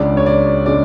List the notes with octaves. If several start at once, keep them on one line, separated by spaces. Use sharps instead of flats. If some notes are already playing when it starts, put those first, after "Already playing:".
Already playing: C#2 C#3 G#3 D4 D5
C#5
D5
C#3 G#3 D4 D5